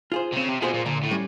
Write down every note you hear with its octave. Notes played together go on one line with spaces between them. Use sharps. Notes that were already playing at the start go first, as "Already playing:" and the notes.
F4 G#4 C5
C3
C#3 C4
C3
B2 F4 G#4 C5
A#2
A#2 D3
A2
G3 C#4